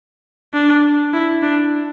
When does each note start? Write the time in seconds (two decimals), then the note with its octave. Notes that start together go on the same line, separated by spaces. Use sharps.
0.54 D4
1.13 E4
1.42 D4